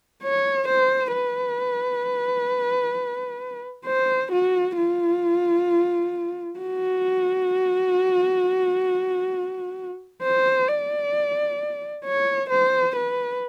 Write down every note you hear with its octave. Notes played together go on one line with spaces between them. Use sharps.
C#5
C5
B4
C5
F#4
F4
F#4
C5
D5
C#5
C5
B4